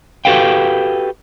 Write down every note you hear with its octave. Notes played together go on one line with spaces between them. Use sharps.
F#4 G4 A4 B4 F5 G5